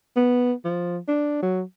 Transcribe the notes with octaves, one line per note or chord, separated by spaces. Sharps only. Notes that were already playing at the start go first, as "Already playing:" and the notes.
B3
F3
D4
F#3